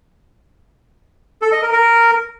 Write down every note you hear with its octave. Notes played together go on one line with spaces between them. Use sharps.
A4
D#5
A#4
A#4